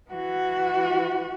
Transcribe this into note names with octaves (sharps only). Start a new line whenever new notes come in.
E3 F#4